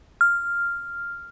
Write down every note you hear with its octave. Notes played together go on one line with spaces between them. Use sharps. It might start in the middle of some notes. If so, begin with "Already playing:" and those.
F6